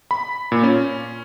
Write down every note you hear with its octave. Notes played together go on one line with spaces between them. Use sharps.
B5
A#2
C#4